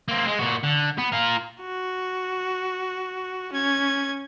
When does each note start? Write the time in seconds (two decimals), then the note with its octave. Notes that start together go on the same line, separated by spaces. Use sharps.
0.08 A#3 C4
0.27 G#3
0.39 A#2 F#4
0.64 D3
0.98 B3
1.12 F4 A#4
1.61 F#4
3.53 C#4 G#6